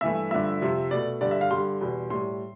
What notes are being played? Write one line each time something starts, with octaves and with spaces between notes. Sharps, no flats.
G2 E3 A3 E5
G2 D3 F3 A3 E5
F2 C3 F3
B2 A3 D5
G2 D3 G3 D5
E5
F5
G2 D3 G3 C6
E2 B2 G3
A2 G3 C6